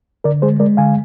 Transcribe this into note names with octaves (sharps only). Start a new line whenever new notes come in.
D3 A#4 D5
G#3 G#4 C5
G#3 A#4 D5
D3 F5 G#5